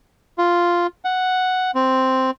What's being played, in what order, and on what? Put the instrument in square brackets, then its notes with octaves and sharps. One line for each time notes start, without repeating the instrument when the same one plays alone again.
[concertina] F4
F#5
C4